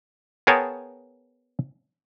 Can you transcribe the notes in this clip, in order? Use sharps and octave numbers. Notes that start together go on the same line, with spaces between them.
B3 G#4 A#4 C#5 G5 A5